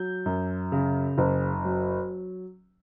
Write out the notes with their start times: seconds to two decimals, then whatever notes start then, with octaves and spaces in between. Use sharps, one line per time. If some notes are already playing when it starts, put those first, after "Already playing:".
Already playing: F#3 G6
0.26 F#2
0.72 C#3
1.18 F#1
1.65 F#3